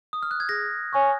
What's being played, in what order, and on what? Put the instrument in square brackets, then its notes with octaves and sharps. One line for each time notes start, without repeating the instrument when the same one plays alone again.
[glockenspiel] D#6
F6
F#6
G#6
[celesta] G#4 [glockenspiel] A#6
[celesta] C#5 G#5 C#6